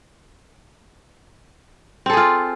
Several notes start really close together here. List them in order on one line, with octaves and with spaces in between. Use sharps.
C4 A4 G#4 F4